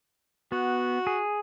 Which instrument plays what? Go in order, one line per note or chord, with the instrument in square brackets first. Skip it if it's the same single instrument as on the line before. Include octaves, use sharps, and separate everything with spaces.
[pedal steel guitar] B3 [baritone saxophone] F#4
[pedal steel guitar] G#4